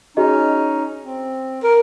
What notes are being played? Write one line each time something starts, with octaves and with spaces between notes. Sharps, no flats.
C#4 D#4 F#4 G#4 D#5
C4
A#4